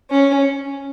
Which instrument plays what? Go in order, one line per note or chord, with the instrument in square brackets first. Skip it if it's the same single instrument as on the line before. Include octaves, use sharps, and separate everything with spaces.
[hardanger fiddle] C#4